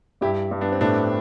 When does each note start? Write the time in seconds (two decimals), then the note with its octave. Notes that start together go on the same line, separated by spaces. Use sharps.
0.21 G2 E4 G4
0.51 G2
0.61 B3 D4
0.72 C4
0.81 A2 B3 D4